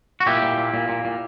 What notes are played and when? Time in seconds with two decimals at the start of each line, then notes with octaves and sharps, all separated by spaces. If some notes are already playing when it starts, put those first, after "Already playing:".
0.20 F#4
0.26 A#2 E4 G4
0.43 A#2
0.58 A#2
0.74 A#2
0.89 A#2
1.05 A#2